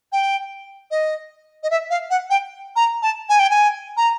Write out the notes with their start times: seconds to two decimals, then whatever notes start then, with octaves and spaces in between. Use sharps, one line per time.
0.12 G5
0.91 D#5
1.63 D#5
1.70 E5
1.90 F5
2.10 F#5
2.30 G5
2.76 A#5
3.02 A5
3.29 G#5
3.39 G5
3.50 G#5
3.97 A#5